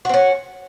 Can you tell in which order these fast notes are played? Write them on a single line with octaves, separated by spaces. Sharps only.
F#4 C4 C#4